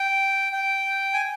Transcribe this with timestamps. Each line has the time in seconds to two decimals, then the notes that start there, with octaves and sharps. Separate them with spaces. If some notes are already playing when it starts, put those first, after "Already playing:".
Already playing: G5
0.53 G5
1.13 G#5